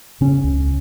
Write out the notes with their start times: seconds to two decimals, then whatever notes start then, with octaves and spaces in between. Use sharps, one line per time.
0.21 C#3 C#4
0.44 C#2